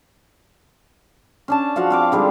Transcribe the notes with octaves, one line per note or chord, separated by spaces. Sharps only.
C#4 D4 A5
F3 F#4 F5 F#5
C4 F5 D6
D3 G3 G#3 D#4